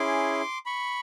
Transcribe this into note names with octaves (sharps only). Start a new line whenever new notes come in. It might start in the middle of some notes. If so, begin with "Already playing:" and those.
Already playing: C#4 E4 G#4 C6 D6
B5 C#6